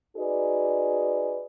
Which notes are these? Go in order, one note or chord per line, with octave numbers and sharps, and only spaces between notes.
D#4 F#4 G#4 B4 D5